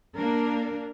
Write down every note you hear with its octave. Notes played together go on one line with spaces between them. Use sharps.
A#3 D4 A#4